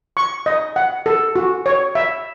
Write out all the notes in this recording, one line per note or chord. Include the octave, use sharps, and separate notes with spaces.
C#6
D#5
F#5
A4
F#4
C#5
E5